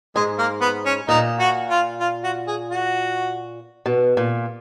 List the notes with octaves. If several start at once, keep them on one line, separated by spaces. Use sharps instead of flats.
G#2 G#3
A#3
B3
C#4
A#2 D#4
F#4
F4
F4
F#4
G#4
F#4
B2
A#2